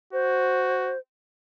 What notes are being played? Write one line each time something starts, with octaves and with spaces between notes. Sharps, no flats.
F#4 C5